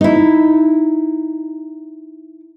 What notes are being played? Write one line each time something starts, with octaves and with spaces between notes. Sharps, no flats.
D#4 E4